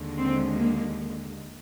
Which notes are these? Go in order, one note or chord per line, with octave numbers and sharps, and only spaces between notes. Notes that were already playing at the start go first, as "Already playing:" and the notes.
Already playing: D#2 D3 G#3
C4
A#3